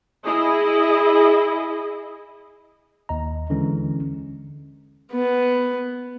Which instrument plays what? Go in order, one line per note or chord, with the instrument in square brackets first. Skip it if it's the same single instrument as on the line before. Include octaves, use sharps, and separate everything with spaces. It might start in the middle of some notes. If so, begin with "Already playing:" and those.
[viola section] E4 G#4 D#5
[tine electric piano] D#2 D#5 A#5
D3 E3 G#3 C#4
[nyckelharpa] B3